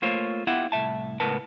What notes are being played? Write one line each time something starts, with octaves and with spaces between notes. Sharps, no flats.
A3 A#3 F4 C5 C#5
B3 E4 F4 G4 E5 F#5
C2 A2 E5 A5
C#2 A2 B3 A#4 B4 A5